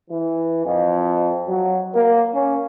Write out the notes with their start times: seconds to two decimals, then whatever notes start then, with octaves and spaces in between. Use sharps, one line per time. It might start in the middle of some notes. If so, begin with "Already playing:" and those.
0.10 E3
0.66 F2
1.47 F#3
1.94 A#3
2.35 C#4